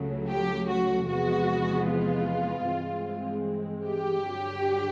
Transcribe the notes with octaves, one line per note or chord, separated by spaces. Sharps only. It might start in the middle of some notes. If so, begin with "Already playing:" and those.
Already playing: C#2 C#3 F#3 A3
G4
F#4
E2 C3 F3 G#3 B3 F#4
F4
G2 E3 G#3 C4
G4
G2 D3 F#3